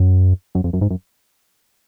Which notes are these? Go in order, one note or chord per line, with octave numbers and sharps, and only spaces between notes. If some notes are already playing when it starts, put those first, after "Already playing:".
Already playing: F#2
F#2
F2
F#2
G#2
F#2